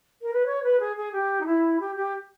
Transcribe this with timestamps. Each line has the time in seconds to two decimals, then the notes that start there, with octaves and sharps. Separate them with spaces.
0.22 A#4
0.34 B4
0.46 C#5
0.63 B4
0.80 G#4
0.97 G#4
1.12 G4
1.41 D#4
1.46 E4
1.80 G4
1.96 G4